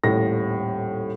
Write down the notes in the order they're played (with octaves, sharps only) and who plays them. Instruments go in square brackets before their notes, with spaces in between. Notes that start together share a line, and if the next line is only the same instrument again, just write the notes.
[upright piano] D#1 A2 A#6